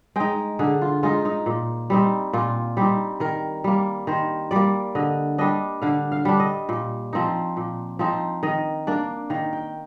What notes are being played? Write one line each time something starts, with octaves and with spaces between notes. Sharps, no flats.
G#3 D#4 G5
D3 G#4
F4
G#3 D#4 F4
D#4
A#2
G3 C4 D#4
A#2 F4
G3 C4 D#4 G4
D#3 A#4
G3 A#3
D#3 C5
G3 A#3 D5
D3 D#5
G3 D4 D#5
D3 F5
F5
G3 D4
D#5
A#2
F3 C4 D#4
A#2
F3 C4 D#4
D#3 D#5
A#3 D4 D5
D#3 F5
G5